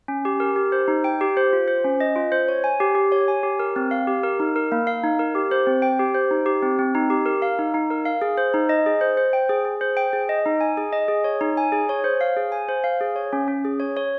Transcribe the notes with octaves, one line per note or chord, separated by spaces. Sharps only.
C#4
G4
A#4
G4
C5
D#4
G5
G4
C5
F4
C5
C#4
D#5
F4
C5
C#5
G#5
G4
G4
C#5
G#5
G4
A#4
C4
F5
G4
A#4
D#4
A#4
A#3
F5
D#4
A#4
G4
C5
C4
G5
G4
C5
D#4
G4
C4
C4
D#4
G4
A#4
F5
D#4
D#4
A#4
F5
G#4
C5
D#4
D#5
G#4
C5
C5
G5
G#4
G#4
C5
G5
G#4
D#5
D#4
G#5
G#4
D#5
G#4
C#5
D#4
G#5
G#4
C#5
C5
F5
G#4
G#5
C5
F5
G#4
C#5
C#4
C#4
G#4
C#5
C#5